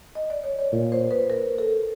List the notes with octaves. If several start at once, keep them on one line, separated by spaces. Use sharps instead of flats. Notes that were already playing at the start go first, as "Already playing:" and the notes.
D#5
D5
C#5
C#5
A#2 D5
C5
B4
A#4
A4